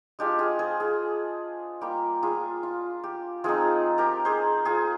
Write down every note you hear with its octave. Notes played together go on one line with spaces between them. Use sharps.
G#3 D4 F4 G4
F4 G#4
G#4 C5
F4 G#4
G3 A#3 F4 G4
F4 G#4
F4
G4
F3 C4 D#4 F4 G#4
G4 A#4
G#4 C5
F4 G#4